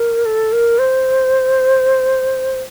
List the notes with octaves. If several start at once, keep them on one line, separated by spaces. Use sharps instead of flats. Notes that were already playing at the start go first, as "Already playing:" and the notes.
Already playing: A#4
A4
A#4
C5